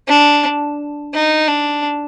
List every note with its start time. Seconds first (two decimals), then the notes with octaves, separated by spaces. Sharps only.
0.08 D4
1.14 D#4
1.48 D4